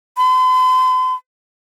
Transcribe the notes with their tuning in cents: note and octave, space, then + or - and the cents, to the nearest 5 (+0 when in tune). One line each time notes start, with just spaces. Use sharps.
C6 -45